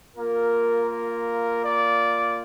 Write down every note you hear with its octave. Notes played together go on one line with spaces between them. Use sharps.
A#3 F4 A#4
A#4
D5